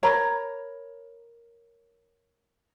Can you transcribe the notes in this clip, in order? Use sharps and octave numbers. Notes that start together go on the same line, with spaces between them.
A#4 C#5 A#5 B5